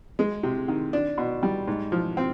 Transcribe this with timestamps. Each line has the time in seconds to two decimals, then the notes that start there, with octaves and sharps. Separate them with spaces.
0.19 G#3
0.43 C3
0.68 D#3
0.93 D4
1.17 B2
1.43 G3
1.68 G#2
1.92 F3
2.17 C4